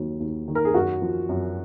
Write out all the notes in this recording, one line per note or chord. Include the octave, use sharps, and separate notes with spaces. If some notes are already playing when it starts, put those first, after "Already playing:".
Already playing: D#2 F#3
D#2
D#3
A#4
G#4
F#2 F#4
F3
F#2